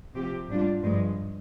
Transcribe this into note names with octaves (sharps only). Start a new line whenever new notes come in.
C3 F3 C4 G4
G#2 G3 D4 F4
G2 F3 G#3